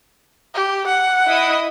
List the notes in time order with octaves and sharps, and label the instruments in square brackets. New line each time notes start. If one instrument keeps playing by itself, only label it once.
[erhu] G4
F#5
[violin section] E4 D#5 D#6